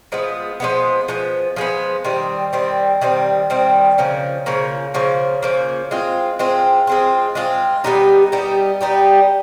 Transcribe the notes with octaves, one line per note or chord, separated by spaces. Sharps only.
F3 G#3 B3
F3 G#3 B3
F3 G#3 B3
F3 G#3 B3
D#3 G3 C4
D#3 G3 C4
D#3 G3 C4
D#3 G3 C4
C#3 F3 A#3
C#3 F3 A#3
C#3 F3 A#3
C#3 F3 A#3
G#3 C4 F4
G#3 C4 F4
G#3 C4 F4
G#3 C4 F4
G3 B3 D#4 G4
G3 B3 D#4 G4
G3 B3 D#4 G4